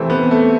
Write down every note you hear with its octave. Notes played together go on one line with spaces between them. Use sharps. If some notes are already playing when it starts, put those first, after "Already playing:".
Already playing: C3 E3 A3 C4
B3
A3